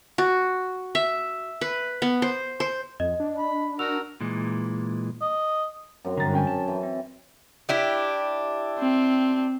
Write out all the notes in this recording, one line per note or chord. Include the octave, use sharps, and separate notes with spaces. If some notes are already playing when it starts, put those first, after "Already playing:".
F#4
E5
B4
B3
C5
C5
F2 D#5
D4
B5
F#4 A#4 E6 F7
A#2 E3 G#3
D#5
F#2 F#3 C4
G2 D3 A#5 A6
C#4 G5 G#5
A5
E3
C4
D4 E4 G4
C4